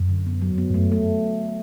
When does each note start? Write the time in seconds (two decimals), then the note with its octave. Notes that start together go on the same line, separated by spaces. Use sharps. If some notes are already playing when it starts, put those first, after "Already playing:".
Already playing: F#2
0.09 D3
0.26 B3
0.42 F#3
0.58 B3
0.70 G2
0.74 F#2 A3
0.92 A3